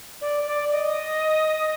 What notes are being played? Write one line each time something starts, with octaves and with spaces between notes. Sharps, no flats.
D5
D5
D#5